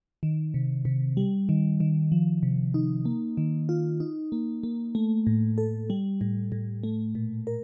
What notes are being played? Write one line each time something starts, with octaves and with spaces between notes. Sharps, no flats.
D#3
C3
C3
G3
D#3
D#3
F3
C3
D#4
A#3
D#3
F4
D#4
A#3
A#3
A3
A2
A4
G3
A2
A2
A3
A#2
A#4